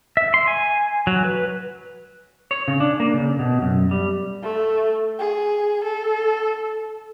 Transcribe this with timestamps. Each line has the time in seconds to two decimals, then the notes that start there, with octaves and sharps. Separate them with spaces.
0.17 E5
0.34 C6
0.47 G#5
1.07 F#3
1.25 B4
2.51 C#5
2.68 C#3
2.80 D4
3.00 A#3
3.14 C#3
3.39 B2
3.62 F#2
3.91 G3
4.43 A3
5.19 G#4
5.84 A4